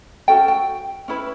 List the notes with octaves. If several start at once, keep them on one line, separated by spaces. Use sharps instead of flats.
C#4 F#4 A4 G5
G5
C#4 E4 B4